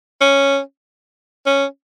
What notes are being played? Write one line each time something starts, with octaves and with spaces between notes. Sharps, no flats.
C#4
C#4